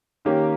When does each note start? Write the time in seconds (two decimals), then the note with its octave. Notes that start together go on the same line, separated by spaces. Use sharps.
0.25 D#3 A#3 C#4 G4